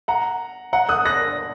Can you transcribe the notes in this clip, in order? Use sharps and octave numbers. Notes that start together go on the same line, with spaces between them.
F#5 A#5
F#5 A#5
D#6 F#6
F#6 A#6